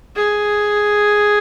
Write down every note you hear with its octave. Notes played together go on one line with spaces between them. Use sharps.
G#4